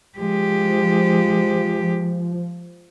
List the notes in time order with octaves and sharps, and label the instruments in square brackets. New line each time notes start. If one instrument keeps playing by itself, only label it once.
[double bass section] F3 [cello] G#3 G4